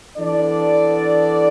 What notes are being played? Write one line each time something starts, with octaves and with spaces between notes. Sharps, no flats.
E3 B3 D4 A4 D5